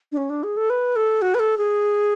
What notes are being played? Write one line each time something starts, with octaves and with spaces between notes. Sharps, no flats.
D4
C#4
D4
G#4
A4
B4
A4
F#4
B4
A4
G#4